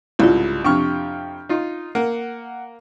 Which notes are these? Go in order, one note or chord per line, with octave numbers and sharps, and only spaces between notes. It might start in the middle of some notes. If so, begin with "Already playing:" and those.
C2 G#2 C#3 E4 F4
F2 C3 D4 G5 C#6 F6
D#4 F4
A#3 F#5